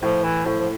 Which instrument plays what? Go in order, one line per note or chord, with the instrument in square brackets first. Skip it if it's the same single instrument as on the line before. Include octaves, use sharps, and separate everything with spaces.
[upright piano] A2 [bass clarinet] F3
[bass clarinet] E3
[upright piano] A2 [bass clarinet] F3
[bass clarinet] F3